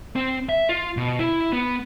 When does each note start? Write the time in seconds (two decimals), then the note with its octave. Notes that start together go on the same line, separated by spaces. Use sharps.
0.16 C4
0.49 E5
0.69 F4
0.97 B2
1.19 E4
1.53 B3